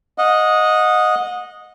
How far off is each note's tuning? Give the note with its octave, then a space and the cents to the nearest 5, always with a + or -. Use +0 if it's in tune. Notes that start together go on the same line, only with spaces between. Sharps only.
D#5 +0 F#5 -30